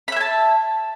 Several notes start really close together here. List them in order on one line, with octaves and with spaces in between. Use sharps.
B5 E5 G#5 A5